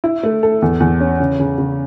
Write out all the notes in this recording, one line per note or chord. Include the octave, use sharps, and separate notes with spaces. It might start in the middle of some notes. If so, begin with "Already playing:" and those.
E4
A3
A4
E2
E2
C#4
C#3
C#3
C#3